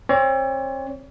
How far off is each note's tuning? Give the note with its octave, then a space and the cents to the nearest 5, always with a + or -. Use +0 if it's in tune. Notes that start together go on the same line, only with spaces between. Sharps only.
C4 +40 C#5 +40